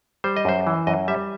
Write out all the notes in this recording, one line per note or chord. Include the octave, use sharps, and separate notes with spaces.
G3 C5
D#5
F#2 C5
E3
F#2 D#5
G3 E5